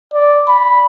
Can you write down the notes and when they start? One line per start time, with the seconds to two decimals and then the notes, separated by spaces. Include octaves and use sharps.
0.14 D5
0.48 B5